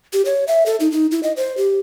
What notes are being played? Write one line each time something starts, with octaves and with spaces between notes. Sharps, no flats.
G4
C#5
E5
A4
D#4
D#4
E4
D#5
C5
G4